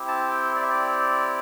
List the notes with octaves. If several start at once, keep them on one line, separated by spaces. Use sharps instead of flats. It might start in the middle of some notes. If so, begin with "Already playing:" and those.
Already playing: C4 E4 G4
A5
G5
D5
E5
D5